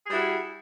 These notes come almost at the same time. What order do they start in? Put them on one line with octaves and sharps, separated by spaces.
G#4 G3 E4 F#4